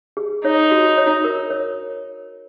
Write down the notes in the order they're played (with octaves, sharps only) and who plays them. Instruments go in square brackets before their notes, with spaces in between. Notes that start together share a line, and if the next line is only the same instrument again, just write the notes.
[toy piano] G#4
[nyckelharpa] D#4 [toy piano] C#5
[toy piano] F#4
C#5
A#4
C#5